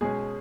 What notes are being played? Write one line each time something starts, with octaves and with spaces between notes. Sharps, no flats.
B2 G#3 C#4 G#4